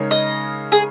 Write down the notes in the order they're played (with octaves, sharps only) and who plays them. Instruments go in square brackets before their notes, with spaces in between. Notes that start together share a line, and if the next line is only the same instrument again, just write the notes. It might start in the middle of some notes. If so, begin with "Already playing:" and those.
Already playing: [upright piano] C#3 G#3 D#4 A#4 C#5
[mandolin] D#5
G#4